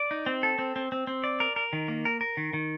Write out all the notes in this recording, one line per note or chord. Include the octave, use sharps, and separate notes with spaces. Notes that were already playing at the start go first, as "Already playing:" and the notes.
Already playing: D5
D#4
C4
A4
C4
C4
C4
C4
D5
A#4
A#4
D#3
A#3
A#4
A#4
D#3
D#3